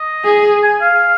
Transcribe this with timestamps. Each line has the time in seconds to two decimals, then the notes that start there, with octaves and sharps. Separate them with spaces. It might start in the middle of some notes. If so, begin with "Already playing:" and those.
Already playing: D#5
0.25 G#4
0.63 G#5
0.81 F5